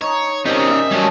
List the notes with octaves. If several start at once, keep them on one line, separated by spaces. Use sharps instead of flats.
D#4 C#5
C#3 C4 C#4 D#4 G4 A#4 D#5
G4 E5
F#3 G3 A3 C#4 G#4 A4